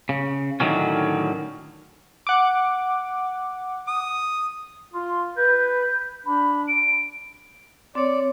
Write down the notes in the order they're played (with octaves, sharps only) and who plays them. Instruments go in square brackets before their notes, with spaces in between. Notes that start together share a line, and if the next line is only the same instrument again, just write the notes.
[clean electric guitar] C#3
A2 D3 D#3 F#3 C#4
[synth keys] F#5 D6
[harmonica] D#6
[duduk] F4 [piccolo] C6
[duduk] B4 [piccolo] G6
[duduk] D4 [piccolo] B5
[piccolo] D7
[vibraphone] C4 C#5 [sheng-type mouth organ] D5